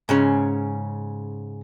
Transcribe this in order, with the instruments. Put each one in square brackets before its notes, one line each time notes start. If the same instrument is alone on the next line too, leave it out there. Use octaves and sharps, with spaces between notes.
[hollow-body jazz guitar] G#2 C#3 C#4